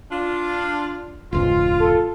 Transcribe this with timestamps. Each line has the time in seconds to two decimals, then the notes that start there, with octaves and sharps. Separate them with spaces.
0.12 D4 F4
1.33 E1 C#2 G#2 F4
1.80 A4